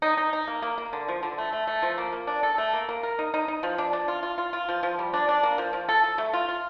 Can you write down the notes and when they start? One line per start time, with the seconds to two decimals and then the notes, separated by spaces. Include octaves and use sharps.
0.02 D#4
0.17 D#4
0.33 D#4
0.48 A#3
0.62 A#3
0.78 A#3
0.93 D3
1.08 F3
1.23 D3
1.38 A3
1.53 A3
1.67 A3
1.82 F3
1.98 A#3
2.13 A#3
2.27 D4
2.43 A4
2.58 A3
2.73 A#3
2.89 A#3
3.03 A#4
3.19 D#4
3.34 D#4
3.48 D#4
3.63 F3
3.78 D4
3.93 D4
4.08 F4
4.23 F4
4.38 F4
4.53 F4
4.69 F3
4.83 F3
4.99 G3
5.13 D4
5.29 D4
5.43 A#3
5.58 F3
5.73 F3
5.89 A4
6.04 A4
6.18 A3
6.33 F4
6.48 F4